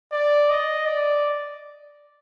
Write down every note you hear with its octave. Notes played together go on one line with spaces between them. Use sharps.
D5
D#5
D5